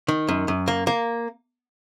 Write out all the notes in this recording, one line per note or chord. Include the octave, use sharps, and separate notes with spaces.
D#3
F#2
F#2
A#3
A#3